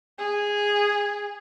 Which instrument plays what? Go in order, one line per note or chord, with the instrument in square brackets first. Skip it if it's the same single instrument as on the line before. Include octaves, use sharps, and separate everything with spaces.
[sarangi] G#4